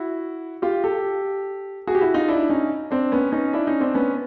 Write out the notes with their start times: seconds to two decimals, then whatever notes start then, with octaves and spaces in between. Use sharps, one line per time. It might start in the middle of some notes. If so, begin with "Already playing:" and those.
Already playing: E4 F#4
0.62 F4 G4
0.84 G4 A4
1.87 F#4 G#4
1.95 G4
2.01 E4 F#4
2.14 D#4 F4
2.28 D4 E4
2.50 C#4 D#4
2.91 C4 D4
3.12 B3 C#4
3.32 C#4 D#4
3.53 D4 E4
3.67 C#4 D#4
3.80 C4 D4
3.94 B3 C#4